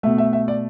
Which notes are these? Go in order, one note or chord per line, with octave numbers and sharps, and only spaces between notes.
B2 A3 E5
E5
E5
D5